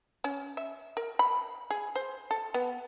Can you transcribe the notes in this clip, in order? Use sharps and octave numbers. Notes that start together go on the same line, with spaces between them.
C#4
E5
A#4
B5
G#4
C5
A4
B3